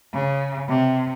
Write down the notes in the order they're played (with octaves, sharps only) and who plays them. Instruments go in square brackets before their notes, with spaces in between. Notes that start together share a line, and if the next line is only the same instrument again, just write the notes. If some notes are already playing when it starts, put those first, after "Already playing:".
[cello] C#3
C3